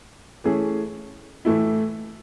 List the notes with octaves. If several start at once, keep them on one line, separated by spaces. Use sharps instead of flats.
E3 A3 C#4 G#4
A2 E3 A3 E4